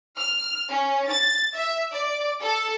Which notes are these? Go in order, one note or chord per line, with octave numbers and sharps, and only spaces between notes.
F6
C#4
A6
E5
D5
A4